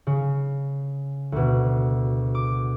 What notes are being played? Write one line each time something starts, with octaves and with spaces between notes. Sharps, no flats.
C#3
D2 B2
D6